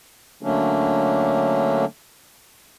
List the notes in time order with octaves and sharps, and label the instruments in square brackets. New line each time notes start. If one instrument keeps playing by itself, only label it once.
[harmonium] D3 F#3 A3 A#3 C#4 D4